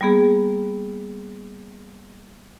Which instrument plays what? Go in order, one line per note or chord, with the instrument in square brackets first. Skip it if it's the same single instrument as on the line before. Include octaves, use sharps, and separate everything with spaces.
[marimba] G3 A#3 B3 G#4